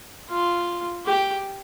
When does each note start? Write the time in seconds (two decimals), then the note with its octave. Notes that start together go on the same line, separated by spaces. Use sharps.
0.29 F4
1.06 G4